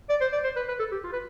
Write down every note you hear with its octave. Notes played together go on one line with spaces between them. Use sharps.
D5
C5
D5
C5
B4
B4
A4
G4
F4
B4